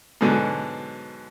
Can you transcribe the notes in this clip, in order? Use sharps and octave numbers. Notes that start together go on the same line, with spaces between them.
G#2 B2 D3 F#3